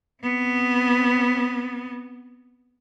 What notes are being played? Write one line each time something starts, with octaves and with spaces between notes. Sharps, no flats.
B3 C4